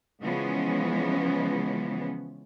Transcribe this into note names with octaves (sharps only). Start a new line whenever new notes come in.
C#3 E3 F3 G#3 B3 C#4